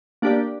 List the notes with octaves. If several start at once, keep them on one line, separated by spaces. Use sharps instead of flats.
A#3 D4 G4 D5